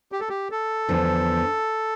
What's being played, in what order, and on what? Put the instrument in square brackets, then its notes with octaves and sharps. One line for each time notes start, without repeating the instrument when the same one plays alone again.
[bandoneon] G4
A4
G4
A4
[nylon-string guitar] E2 D3 F3